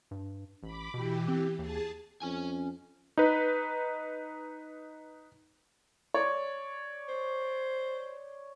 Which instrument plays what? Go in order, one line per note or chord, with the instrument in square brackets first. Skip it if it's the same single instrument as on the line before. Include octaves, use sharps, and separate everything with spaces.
[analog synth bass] G2
[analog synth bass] A1 [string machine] B5 D6
[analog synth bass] B2 [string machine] E3 G4
[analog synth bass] C4
[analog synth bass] D#2 [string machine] G#4 A5
[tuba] F2 [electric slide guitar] C#4 G#5
[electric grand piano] D#4 B4
[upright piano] C#5 D5
[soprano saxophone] C5